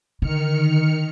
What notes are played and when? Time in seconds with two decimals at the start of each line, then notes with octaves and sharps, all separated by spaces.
0.22 D3 D#3 F6 C#7